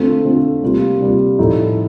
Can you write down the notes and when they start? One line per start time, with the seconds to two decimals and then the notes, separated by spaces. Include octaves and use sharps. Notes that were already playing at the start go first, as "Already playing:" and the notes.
Already playing: D3 A3 C4 F4
0.25 D3 A3 C4 F4
0.62 C3 G3 A#3 F4
1.01 C3 G3 A#3 F4
1.38 A2 F3 A3 D#4